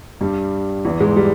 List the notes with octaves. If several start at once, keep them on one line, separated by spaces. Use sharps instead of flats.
G2 G3
E2 E3
G#2 G#3
G3